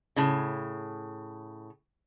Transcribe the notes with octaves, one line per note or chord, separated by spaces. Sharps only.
A2 C#3